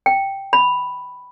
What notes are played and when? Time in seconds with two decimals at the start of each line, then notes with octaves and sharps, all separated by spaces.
0.06 G5
0.53 B5